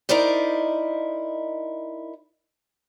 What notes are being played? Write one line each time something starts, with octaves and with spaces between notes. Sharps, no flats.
D#4 E4 A#4 C5 D5 D#5